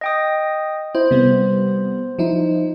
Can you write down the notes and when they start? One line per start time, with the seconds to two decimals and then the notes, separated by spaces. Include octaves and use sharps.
0.01 D#5 G5 D#6
0.95 E4 C5
1.11 C3 G3 B3
2.19 F3 D#4 E4